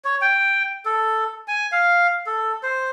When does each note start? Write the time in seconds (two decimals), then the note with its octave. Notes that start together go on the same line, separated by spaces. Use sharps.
0.05 C#5
0.21 G5
0.85 A4
1.48 G#5
1.72 F5
2.26 A4
2.63 C5